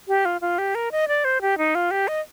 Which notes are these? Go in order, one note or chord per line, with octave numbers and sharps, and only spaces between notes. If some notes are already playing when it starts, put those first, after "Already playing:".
G4
F4
F4
G4
A#4
D#5
D5
C5
G4
D#4
F4
G4
D#5